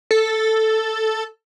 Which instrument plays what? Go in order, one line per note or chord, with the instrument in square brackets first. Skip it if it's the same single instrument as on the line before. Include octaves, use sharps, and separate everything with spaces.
[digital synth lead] A4